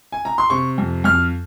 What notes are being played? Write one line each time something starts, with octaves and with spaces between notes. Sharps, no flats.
G#5
A#5
C6
C3 C#6
F2
F2 F6